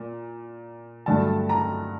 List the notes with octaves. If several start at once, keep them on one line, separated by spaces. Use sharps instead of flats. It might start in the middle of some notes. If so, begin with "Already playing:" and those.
Already playing: A#2
G2 D3 F#3 A3 A5
A#5